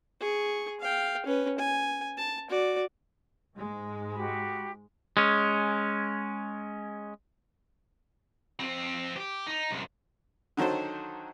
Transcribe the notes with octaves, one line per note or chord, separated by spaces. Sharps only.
G#4 C#6
F5 G5
C#4 B4
G#5
A5
F#4 D5
G#2 G#3
F#4 G4 B5
G#3 C#4
F2 C4
G4
D#4
C2 F#2
D3 D#3 F#3 A4 C5